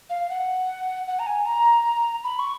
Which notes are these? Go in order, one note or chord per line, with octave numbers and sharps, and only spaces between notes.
F5
F#5
F#5
A#5
G#5
A#5
B5
C#6